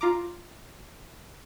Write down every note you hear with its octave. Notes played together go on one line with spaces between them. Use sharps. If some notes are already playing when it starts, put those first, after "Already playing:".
F4 A#5 D6